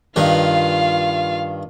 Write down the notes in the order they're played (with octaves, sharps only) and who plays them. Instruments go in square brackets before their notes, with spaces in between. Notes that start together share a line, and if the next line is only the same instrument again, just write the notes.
[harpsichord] G2 D#3 B4 [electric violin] F4 F5